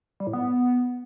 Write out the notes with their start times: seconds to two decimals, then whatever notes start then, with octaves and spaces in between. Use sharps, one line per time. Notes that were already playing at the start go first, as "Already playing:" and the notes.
0.20 G3
0.27 A2
0.33 B3